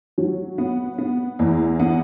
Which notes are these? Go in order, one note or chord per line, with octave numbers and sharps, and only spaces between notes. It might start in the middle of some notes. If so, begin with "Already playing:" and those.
F#3
B3
B3
E2
B3